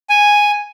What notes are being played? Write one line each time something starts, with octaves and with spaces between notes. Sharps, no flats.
G#5